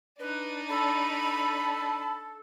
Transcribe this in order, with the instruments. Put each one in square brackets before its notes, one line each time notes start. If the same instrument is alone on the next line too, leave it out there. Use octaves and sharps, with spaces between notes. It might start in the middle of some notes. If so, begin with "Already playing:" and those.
[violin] D4 D#4 [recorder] B4
[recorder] A4 [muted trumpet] A5 [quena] B5